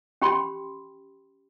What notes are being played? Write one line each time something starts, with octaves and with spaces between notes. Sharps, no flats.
C#4 G4 G5 B5 C6